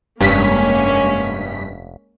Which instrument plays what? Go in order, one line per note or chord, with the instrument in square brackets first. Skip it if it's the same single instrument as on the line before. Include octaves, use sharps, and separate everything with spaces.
[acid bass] F1 [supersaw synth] G2 B6 [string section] G#3 A#3 C#4